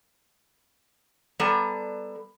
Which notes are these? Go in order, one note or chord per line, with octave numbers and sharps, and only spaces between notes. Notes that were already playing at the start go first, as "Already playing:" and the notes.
G3 B3 A4 A#5